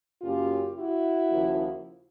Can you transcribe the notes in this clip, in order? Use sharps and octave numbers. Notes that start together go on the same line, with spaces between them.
F#2 C#3 F#3 A#3 F4 G4
E4 F#4
D#2 C#3 F3 A#3